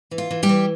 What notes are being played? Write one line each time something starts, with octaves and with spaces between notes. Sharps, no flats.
E3
F4
E3
G3 G4
E3